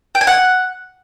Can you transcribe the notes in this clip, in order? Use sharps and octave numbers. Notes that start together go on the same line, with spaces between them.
G5
G#5
F#5